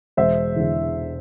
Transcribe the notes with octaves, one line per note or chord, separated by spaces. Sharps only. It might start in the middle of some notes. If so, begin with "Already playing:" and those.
E1 C5 E5
E2 D3